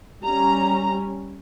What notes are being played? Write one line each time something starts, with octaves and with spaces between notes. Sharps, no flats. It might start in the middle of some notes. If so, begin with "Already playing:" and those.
G3 C#4 A#5